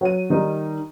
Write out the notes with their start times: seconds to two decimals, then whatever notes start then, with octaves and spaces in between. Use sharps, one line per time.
0.01 F#3 D#7
0.30 D#3 G3 D#4